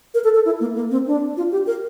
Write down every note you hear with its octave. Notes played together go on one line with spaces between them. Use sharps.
A#4
A4
A4
E4
A#3
A#3
C4
D4
F4
G4
A#4